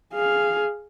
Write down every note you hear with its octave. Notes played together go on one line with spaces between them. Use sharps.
G#4 F5